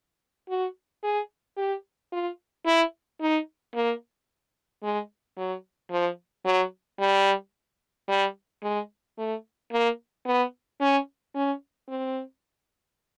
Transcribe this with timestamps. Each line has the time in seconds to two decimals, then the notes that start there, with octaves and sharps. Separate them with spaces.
0.49 F#4
1.04 G#4
1.57 G4
2.12 F4
2.66 E4
3.21 D#4
3.75 A#3
4.83 G#3
5.37 F#3
5.91 F3
6.45 F#3
7.00 G3
8.09 G3
8.63 G#3
9.18 A3
9.72 A#3
10.26 B3
10.81 C#4
11.35 C#4
11.88 C4